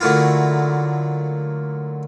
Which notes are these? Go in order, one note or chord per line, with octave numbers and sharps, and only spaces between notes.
D3 F#3 A3 A#3 E4 F4